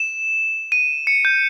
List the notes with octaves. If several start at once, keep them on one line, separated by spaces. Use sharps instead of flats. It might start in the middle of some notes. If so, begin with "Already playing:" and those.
Already playing: E7
D#7
C#7
G6